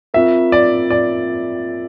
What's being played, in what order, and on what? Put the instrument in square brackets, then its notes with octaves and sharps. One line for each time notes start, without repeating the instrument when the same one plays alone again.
[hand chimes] C4 F4 A#4 [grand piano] E5
[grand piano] D5
D5